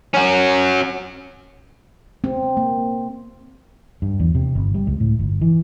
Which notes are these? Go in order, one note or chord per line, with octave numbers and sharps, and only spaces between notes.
C#4 F#4
C4
A#3
G2
E2
C3
G1
G3
C#2
A2
G1
E3